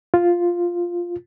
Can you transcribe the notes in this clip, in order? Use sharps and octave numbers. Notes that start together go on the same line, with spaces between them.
F4